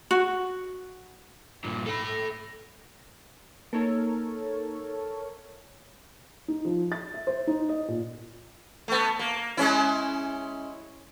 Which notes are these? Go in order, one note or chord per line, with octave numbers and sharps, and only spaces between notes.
F#4
G2 A#2
A4 B5
A#3 D#4 A4 A#4 C#5
D#4
F3
A6
E5
C5
D#4
D#5
A#2
A3 B3
A#3
G#3 C#4 E4